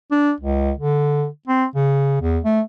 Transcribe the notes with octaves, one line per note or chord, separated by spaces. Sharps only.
D4
C#2
D3
C4
C#3
E2
A3